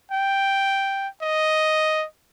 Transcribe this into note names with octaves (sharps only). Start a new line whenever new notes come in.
G5
D#5